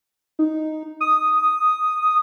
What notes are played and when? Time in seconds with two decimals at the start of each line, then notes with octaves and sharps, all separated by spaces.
0.39 D#4
1.01 D#6